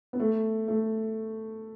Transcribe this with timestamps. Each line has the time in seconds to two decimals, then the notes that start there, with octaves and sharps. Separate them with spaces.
0.13 B3
0.20 A3
0.68 A3